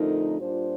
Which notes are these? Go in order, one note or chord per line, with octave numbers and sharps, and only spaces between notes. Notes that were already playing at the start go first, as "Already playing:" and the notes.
Already playing: F2 D3 A3 D#4 A#4
A#2 G3 D4 F4 C5